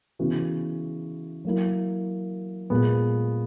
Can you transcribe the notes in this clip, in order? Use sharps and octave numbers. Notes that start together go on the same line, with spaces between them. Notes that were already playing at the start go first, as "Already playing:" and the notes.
C#3 E3 B3 F#4
F#3 A#3 E4
A#2 G#3 B3